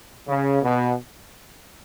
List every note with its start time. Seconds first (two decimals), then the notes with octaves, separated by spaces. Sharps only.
0.27 C#3
0.63 B2